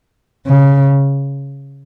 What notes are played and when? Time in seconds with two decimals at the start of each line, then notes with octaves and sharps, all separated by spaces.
0.47 C#3